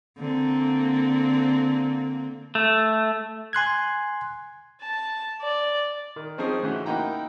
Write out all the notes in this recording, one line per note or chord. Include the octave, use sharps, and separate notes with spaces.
D3 A#3 C4
A3
G#5 C6 F#6 G#6
A5
D5
D#3
F3 C4 C#4 D#4 G#4
A2 C#3 E3 C#4 F#4
A#3 D#4 E4 F#5 G5 A#5